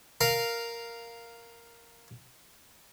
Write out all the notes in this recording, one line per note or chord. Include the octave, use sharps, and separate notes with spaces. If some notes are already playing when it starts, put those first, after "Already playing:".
A#4 F5